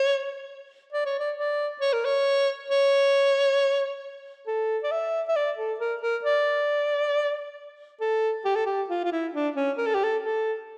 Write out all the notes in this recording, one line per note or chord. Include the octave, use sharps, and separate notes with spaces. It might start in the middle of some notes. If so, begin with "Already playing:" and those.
Already playing: C#5
D5
C#5
D5
D5
C#5
A#4
C#5
C#5
A4
D5
E5
E5
D5
A4
A#4
A#4
D5
A4
G4
A4
G4
F4
F4
E4
D4
C#4
A#4
A4
G4
A4
A4